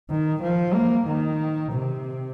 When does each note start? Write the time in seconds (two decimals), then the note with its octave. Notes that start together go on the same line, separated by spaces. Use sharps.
0.10 D#3
0.42 F3
0.74 A#3
1.08 D#3
1.72 C3